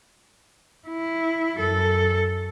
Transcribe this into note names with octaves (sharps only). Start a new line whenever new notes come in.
E4
F#2 A4